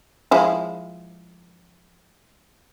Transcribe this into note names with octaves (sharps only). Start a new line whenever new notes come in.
F3 G#3 E4